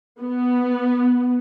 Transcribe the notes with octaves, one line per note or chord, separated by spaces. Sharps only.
B3